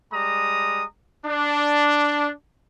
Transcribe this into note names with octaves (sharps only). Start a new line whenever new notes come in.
G3 G#3 A#5 D#6
D4